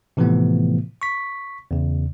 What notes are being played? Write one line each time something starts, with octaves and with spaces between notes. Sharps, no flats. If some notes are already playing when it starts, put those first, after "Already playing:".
A2 C3 E3 F3 A3 B3
C#6 B6
E2 C#3